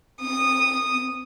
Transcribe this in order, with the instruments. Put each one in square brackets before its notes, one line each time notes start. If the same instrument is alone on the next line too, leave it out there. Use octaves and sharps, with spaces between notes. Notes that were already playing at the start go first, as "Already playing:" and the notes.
[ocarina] C4 [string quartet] D#6